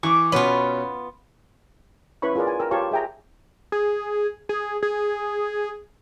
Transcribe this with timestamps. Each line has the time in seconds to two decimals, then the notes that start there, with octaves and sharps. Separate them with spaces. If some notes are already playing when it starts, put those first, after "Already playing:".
0.03 E3 C#6 D6
0.32 B2 B3 C#4 F4
2.22 C#4 E4 B4 C#5 B5 C#6
2.35 F4 G#4 A#4 B4 D5
2.47 G#5
2.60 A#4 G5 E6
2.71 F4 G4 C#5 F5 A5 C#6
2.91 G#4 E5 G5 G#5 A#5
3.72 G#4
4.49 G#4
4.83 G#4